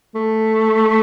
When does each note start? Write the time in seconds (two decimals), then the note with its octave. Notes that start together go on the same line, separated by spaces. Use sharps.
0.15 A3